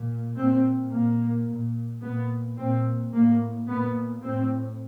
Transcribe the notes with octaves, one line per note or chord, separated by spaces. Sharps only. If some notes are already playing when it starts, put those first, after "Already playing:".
Already playing: A#2
A#2 C4
A#2 A#3
A#2
A#2 B3
A#2 C4
A2 A#3
A#2 B3
A2 C4